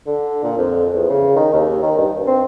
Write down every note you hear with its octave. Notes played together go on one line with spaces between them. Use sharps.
D3
A#2
F2
E2
C#3
D#3
D#2
D#3
G2
C4